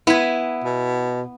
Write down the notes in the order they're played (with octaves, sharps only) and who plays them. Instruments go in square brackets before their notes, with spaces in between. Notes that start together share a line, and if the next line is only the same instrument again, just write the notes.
[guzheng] B3 G#5 [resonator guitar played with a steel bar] E4
[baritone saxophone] B2